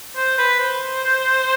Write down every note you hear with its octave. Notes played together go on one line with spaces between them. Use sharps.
C5
B4
C5